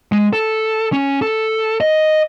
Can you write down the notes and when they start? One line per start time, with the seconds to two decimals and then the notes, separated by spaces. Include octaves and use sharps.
0.12 G#3
0.33 A4
0.93 C#4
1.22 A4
1.81 D#5